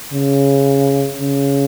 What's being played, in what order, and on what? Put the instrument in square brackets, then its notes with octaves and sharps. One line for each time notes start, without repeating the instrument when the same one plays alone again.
[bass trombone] C#3
C#3